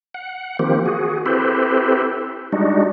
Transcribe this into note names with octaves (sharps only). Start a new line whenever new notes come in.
F#5
D#3 F3 A#3 C4 G4
F#4 G#4
C4 E4 G4 A4 B4 C5
G3 G#3 D4 D#4 F#4